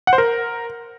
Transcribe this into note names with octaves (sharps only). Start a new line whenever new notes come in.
F#5
C5
A#4